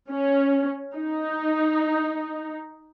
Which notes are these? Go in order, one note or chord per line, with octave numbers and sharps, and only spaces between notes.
C#4
D#4